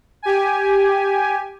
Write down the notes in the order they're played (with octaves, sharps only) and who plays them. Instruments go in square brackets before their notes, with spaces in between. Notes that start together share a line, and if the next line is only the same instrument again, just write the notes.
[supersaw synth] G4 G#5